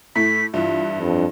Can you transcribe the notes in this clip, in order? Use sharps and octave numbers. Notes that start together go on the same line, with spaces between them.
A2 A3 E4 B6
G2 E3 F4 E5
F2 D4